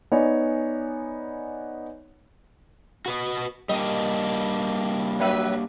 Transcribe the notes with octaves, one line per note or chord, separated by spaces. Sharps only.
B3 D#4 C#5 D5 G#5
F#4 B4 D#5
G3 A#3 D4 D#5
F#3 B4 E5